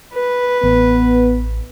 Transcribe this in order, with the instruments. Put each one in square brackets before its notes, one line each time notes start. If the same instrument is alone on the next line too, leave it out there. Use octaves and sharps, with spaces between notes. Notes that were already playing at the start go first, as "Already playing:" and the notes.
[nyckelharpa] B4
[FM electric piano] A1 [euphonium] B3